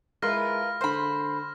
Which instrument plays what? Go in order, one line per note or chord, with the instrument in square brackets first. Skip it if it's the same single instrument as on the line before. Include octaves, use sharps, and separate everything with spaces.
[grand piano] G#3 E4 [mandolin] F4 A#4 B4 [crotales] F6 A#6
[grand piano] D3 C6 [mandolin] C5 B5